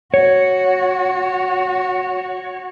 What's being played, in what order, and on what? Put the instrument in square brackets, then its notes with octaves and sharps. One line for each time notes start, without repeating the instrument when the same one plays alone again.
[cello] F#4 [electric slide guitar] C#5